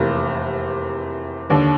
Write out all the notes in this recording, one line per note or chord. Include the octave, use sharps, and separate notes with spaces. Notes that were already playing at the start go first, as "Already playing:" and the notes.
Already playing: F1 E2 C3 A#3
D#2 D3